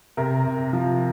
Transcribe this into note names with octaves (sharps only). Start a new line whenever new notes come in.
C3 A#4
C3
F3